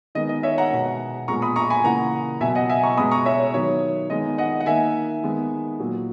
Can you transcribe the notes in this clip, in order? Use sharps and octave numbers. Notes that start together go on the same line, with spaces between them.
D#3 G#3 B3 D#5
D#5
C#5 E5
F#5 A#5
B2 G#3 B3
A#2 G#3 B3 A#5 C#6
B5 D#6
A#5 C#6
G#5 B5
C#3 E3 A#3 F#5 A#5
B2 F#3 B3 E5 G#5
D#5 F#5
E5 G#5
A#5 C#6
B2 G#3 B3 B5 D#6
A#5 C#6
C#5 E5
C#5
D#3 F#3 B3 C#5
D#3 G#3 B3 D#5
D#5 F#5
F#5
D#3 A#3 E5 G#5
D#3 G#3 B3
A#2 F#3 A#3